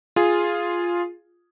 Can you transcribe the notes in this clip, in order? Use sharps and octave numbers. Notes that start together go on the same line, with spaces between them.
F4 G#4